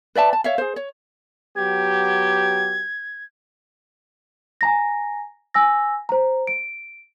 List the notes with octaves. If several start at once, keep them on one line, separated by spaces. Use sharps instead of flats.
B4 D5 E5 A5
A5
C#5 E5 F5
G#4 C5
C#5
F#3 B3 G4 G#6
G#5 A#5 A#6
G#5 E6 A#6
C5 A#5
D7